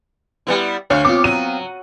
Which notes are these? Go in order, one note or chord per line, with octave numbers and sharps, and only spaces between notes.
G3 B3 E4
D2 C5 C#5 F5 G#5
B3 C4 F4 D6
F#3 D#7